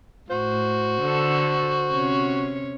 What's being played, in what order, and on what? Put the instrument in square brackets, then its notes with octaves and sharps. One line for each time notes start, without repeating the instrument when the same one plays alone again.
[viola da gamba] A2 [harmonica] F#4 [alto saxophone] C5
[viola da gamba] D3 A4
C3 C#4 C#5